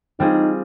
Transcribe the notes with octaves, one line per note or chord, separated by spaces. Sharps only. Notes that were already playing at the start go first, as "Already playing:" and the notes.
G3 C4 D#4 F4 G#4